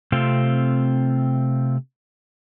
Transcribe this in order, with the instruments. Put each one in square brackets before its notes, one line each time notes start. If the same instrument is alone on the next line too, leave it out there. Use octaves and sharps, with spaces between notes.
[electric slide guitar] C3 A3 C4 F4